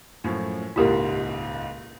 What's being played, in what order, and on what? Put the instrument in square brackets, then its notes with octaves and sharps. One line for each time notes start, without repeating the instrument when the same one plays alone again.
[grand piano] F#2 A2 F3
[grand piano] D#1 C#2 G#2 [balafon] E4 G4 A#4